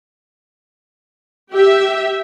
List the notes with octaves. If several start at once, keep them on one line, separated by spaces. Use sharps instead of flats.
G4 E5